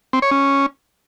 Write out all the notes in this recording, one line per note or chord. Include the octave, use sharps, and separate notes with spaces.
C4
C#5
C#4